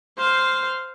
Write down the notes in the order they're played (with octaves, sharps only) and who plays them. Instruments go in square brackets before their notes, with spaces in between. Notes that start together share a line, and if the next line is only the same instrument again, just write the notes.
[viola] C5 F5